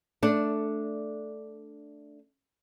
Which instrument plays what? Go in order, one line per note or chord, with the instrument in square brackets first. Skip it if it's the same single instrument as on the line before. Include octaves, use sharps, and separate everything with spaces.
[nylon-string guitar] A3 D4